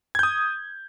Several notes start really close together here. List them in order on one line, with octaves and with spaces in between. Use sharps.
G#6 G6 D#6